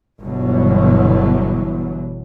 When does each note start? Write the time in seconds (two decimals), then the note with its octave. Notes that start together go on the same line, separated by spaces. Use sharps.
0.23 G1 B2 D3 E3 F#3